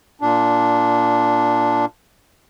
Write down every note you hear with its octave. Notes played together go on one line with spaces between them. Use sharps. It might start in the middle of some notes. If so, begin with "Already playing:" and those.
A#2 D4